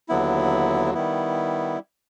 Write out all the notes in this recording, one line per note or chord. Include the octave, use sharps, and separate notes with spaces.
D#2 D3 F#3 B3 E4
D#3 G3 B3 E4